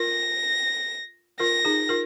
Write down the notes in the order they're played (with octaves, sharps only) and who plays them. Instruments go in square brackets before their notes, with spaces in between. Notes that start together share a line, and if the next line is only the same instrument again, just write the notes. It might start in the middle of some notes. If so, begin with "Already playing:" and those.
Already playing: [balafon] F4 A#4 [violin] A#6
[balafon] F4 A#4 [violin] A#6
[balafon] D#4 G#4
F4 A#4